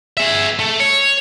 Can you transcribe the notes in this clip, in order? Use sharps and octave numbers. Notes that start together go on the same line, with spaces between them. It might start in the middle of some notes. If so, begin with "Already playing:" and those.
G#4 E5
A3
C#5